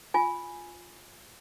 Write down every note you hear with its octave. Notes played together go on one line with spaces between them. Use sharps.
F4 G#5